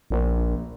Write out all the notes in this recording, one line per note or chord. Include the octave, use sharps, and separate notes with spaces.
A#1